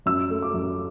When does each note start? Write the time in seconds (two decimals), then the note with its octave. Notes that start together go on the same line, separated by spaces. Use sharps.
0.06 F#2 E6
0.30 A3
0.42 D6
0.54 F#2